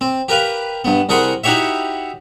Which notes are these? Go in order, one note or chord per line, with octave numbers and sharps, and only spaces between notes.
C4
G4 A#4 B4 F5
G2 B3
C2 G#4 A#4 F#5 B5 C6
D#4 E4 F#4 G4 C#5 E5